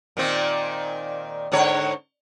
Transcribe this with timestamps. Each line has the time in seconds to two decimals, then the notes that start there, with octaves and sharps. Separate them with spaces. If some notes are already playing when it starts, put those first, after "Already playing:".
0.17 A#2 D#3 C4
1.52 G#2 D3 C#5